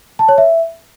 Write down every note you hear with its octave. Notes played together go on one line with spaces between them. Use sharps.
A5
C#5
E5